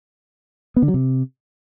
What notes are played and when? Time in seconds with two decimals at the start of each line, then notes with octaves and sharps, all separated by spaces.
0.76 B3
0.82 D3
0.88 F#3
0.94 C3